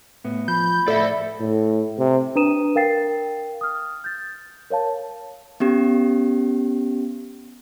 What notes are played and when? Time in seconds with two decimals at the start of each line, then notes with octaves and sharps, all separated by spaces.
0.24 A2 B3
0.48 F3 B5 G6
0.88 A2 A4 D5 E5
1.40 A2
1.98 C3
2.36 D4 B4 A#5 D#6 D#7 E7
2.76 A#4 F5 G5 A6 C7
3.61 D#6 F6
4.04 G6 A6
4.70 A#4 C#5 F5 A5
5.60 B3 C#4 G4